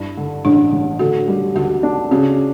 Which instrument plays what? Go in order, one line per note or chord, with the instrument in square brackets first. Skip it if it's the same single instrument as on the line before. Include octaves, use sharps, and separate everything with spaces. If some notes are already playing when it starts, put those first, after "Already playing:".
Already playing: [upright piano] G2 E4
D3
[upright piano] A1 [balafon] D4
[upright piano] A1
[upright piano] D3 [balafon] F#4
[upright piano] G3
[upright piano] D2 [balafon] F#4
[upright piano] D4
[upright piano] C#3 [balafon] F#4